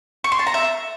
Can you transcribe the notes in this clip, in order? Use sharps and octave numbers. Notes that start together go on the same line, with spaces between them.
C#6
C6
A5
A#5
E5